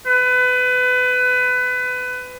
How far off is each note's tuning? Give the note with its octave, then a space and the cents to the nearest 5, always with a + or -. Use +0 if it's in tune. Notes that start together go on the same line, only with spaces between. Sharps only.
B4 +25